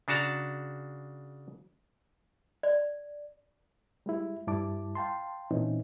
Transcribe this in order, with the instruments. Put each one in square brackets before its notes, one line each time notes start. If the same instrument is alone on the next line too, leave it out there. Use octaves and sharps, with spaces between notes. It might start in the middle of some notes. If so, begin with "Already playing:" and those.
[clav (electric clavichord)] C#3 D4 F#4 A5 A#5
[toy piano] D5
[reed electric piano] G3 G#3 E4
G2 G3 E4 A5 D6
F5 G5 A5 C6
A#2 E3 C4 C#4 D#4